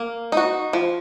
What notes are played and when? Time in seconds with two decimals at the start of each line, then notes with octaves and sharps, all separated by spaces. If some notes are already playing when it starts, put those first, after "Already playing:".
Already playing: A#3
0.32 D#4 F#4
0.73 F3